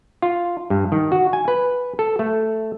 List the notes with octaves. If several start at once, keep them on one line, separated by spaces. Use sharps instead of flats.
F4
G2
D#3
F#4
G#5
B4
A4
A3